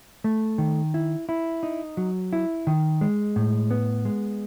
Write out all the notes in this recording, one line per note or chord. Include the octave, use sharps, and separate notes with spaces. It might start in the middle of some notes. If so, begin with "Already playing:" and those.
A3
D#3
E4
E4
D#4
F#3
E4
D#3
G#3
A2
B3
G#3